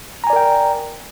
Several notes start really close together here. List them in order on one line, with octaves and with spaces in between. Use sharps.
A#5 G#5 D5 A#4 G5